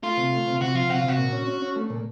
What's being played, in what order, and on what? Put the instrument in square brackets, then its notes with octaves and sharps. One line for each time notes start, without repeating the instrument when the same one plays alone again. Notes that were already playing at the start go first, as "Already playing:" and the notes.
[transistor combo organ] A3 [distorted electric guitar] F4
[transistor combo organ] C3
A3
C3
[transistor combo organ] C3 [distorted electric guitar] F#4
[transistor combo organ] F3 [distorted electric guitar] F4
[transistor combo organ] C3 [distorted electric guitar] F#4
[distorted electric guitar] F4
[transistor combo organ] C3 [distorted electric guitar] F#4
[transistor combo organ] A#2
C#4
C#4
C#4
A3
A#2